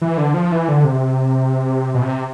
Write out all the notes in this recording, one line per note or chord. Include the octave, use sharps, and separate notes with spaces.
E3
D3
F3
E3
D3
C3
B2
C3